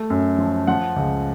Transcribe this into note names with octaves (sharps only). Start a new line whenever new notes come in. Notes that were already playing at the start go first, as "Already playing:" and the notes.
Already playing: A3
F#2
F3
F3 F#5
C#2